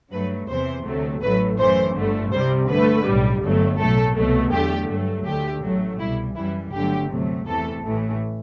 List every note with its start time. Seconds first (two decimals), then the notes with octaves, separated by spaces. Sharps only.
0.11 G2 F#3 A3 B4
0.48 E2 C3 E3 C5
0.84 D2 C3 F#3 A3
1.22 A1 A2 F#3 A3 B4
1.58 F#2 E3 A3 C5
1.95 G1 G2 D3 A3
2.32 C2 C3 G3 C5
2.68 G2 D3 A3 B4
3.05 B1 A2 G3
3.42 G1 G2 F#3 A3
3.79 B1 A2 F#3 A3 A4
4.15 C2 B2 F#3 A3
4.52 E2 D3 A3 G4
4.89 G2 F#3 A3
5.26 D2 D3 A3 G4
5.63 A1 A2 F#3 A3
5.99 C2 B2 G3 E4
6.36 F#2 E3 G3 E4
6.72 G1 G2 D3 F#3 A3 G4
7.10 D2 C3 F#3 A3
7.46 E2 C3 E3 A3 A4
7.83 A1 A2 E3 A3